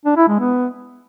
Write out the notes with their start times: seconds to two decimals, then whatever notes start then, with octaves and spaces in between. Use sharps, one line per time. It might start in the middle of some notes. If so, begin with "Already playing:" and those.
0.06 D4
0.17 E4
0.28 G#3
0.39 B3